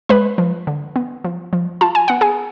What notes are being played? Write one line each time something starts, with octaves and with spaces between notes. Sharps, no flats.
G#3 B4 B5
F3
D3
B3
F3
F3
F4 A5
G#5
B3 F#5
G#4 G#5